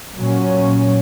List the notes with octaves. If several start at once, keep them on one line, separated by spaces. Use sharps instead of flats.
A#2 F#3 C#4